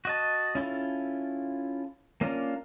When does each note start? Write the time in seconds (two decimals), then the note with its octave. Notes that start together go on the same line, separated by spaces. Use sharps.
0.05 F#4 D#5 A5
0.55 C#4 E4 F4 A4
2.21 A#3 C#4 D4 F4 A#4